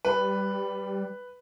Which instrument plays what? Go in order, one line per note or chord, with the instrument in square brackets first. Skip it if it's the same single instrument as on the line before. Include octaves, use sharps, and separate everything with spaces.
[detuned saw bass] G3 [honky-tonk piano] B4